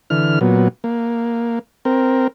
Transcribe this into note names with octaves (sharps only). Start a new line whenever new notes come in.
D3 E3 F6
A#2 F#3 B3
A#3
C4 A#4